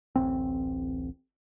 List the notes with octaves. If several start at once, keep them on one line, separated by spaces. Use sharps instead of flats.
D1 A1 C4